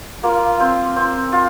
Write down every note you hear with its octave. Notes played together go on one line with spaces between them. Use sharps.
A#3 F4
C4
C4
F4